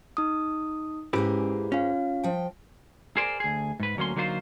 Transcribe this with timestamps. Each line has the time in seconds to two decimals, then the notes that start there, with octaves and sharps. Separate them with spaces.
0.17 D#4 D#6
1.13 G#2 G#3 A#3 C#4 E4 G4 B4
1.72 C#4 F4 F5
2.23 F3 G5
3.17 G#4 A#4 C5 D5
3.40 D2 G#4
3.80 G#2 B4
3.97 D2 F#3 A#3 C#4 C6
4.16 D3 F#3 A#3 D#4 F4 C5